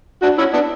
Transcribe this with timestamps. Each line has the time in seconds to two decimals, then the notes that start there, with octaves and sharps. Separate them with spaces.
0.22 D4 F#4
0.38 C#4 E4
0.53 B3 D4